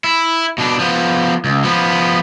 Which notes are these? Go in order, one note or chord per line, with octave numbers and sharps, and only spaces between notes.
E4
B2 D4
F3 B3
C#2
F3 B3